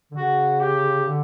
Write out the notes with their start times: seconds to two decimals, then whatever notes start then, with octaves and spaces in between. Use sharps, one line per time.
0.11 D3
0.17 C#3 F#4
0.60 G4
1.05 D3